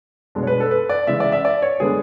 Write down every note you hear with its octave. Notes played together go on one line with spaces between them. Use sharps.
B2 G#3 D4
C#5
B4
A4
B4
D5
C#3 E3 G#3 E5
D5
E5
D5
C#5
D3 G#3 B3 D4 G#4